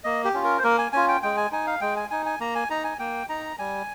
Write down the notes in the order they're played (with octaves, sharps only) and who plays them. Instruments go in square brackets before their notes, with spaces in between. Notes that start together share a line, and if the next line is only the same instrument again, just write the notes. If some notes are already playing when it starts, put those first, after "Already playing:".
[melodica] A#3 D#5
G4
C#4 F4
A#4
C5
A#3 A#4
G#5
C#4 F4 G#5
G5
G#3 G5
G#5
D#4 G#5
F5
G#3 G5
G#5
D#4 G#5
G#5
A#3 A#5
G#5
D#4 A#5
G#5
A#3 G5
D#4 A#5
G3 G#5